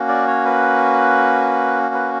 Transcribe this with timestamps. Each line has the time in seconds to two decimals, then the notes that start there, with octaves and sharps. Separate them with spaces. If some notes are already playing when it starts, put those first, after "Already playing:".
Already playing: A#3 C#4 F#4
0.08 D5
0.28 C#5
0.45 B4
1.94 B4